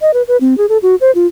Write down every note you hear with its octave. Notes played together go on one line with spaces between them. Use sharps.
D#5
B4
B4
C4
G#4
A4
F#4
C5
F4